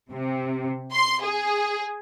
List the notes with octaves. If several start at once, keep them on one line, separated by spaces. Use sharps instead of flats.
C3
C6
G#4